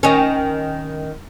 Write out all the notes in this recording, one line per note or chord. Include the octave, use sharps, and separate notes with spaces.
D#3 C#4